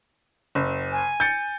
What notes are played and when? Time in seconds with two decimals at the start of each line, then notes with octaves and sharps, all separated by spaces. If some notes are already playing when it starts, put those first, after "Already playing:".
0.55 F#1
0.92 G#5
1.20 G6 A6 C#7